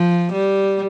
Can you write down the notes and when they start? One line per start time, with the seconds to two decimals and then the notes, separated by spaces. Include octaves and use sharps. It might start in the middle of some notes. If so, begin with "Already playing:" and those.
Already playing: F3
0.33 G3